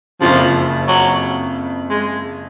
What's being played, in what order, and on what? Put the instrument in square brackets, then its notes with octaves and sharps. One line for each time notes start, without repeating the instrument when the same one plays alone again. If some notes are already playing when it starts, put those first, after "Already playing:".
[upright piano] F#1 F2 C#3 [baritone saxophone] F3
[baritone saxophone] F#3
G#3